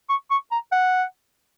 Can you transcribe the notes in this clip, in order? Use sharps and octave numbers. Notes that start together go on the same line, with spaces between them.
C#6
C#6
A#5
F#5